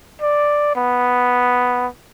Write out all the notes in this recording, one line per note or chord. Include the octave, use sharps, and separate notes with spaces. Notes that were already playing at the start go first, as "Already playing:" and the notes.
D5
B3